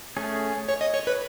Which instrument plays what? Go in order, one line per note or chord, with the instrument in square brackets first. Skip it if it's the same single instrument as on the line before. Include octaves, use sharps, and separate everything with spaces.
[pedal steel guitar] A3 C#4 G#4
[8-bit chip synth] C#5
D#5
C#5
B4